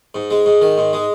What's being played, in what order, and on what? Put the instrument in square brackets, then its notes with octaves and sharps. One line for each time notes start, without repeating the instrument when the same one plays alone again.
[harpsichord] G#2
G#3
G#2
D#3
G#2
G#3